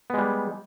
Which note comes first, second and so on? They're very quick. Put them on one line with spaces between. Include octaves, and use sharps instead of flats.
B3 G#3 G3